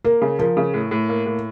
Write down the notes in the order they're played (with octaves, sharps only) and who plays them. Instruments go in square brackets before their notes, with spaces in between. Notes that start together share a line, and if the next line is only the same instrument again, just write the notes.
[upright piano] A#3 [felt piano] A#4
[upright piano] C#3
[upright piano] F3 [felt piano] A#4
[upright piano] C#3
A2
A2
A#3
A2